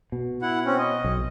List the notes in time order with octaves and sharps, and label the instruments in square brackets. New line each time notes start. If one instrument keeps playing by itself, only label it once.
[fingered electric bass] B2
[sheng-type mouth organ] E4 F#5
C4 C#4
D#5
[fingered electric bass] B1